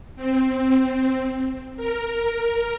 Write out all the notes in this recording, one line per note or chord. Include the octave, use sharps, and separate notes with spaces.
C4
A#4